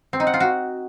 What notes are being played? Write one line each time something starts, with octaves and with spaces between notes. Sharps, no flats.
C4
D#4
F#5
F4
F#4